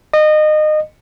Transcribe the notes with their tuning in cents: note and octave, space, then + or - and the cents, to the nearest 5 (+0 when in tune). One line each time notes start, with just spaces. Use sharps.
D#5 -25